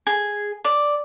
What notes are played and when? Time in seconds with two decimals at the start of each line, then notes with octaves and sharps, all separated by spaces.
0.07 G#4
0.65 D5